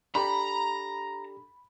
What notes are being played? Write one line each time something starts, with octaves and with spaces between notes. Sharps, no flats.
D4 G4 A4 A#5 B5